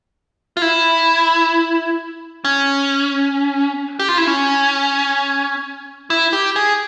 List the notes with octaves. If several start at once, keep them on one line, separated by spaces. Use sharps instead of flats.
F4
E4
C#4
G4
F4
E4
C#4
E4
G4
G#4